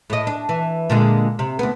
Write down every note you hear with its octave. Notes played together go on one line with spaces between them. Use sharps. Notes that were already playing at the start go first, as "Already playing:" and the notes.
A2 D#5
D4
E3
A#2 D3 G#3
C3
D2 B3